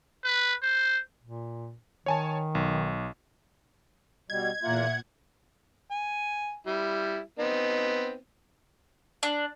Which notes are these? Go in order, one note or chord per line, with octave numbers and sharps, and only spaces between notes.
B4
C5
A#2
D#3 C#5 G#5 A5
B1
B2 G3 D#5 G#6
E2 A#2 A#3 F4 E5 F#5
G#5
G3 E4
B3 C4 D#4
D4